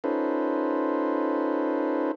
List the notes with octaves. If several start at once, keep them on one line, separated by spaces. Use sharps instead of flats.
C#4 D#4 F4 A4 B4 C5